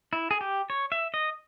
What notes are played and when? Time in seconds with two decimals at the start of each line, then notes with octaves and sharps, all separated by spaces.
0.13 E4
0.31 G#4
0.41 G4
0.70 C#5
0.92 E5
1.14 D#5